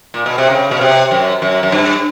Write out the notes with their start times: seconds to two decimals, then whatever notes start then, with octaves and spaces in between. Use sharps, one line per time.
0.14 A#2
0.26 B2
0.38 C3
0.50 C#3
0.71 B2
0.81 C3
1.11 F#2
1.42 F#2
1.63 F#2
1.72 G2